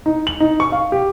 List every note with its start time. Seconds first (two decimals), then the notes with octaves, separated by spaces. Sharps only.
0.06 D#4
0.27 F#7
0.40 D#4
0.60 C#6
0.72 F5
0.92 G4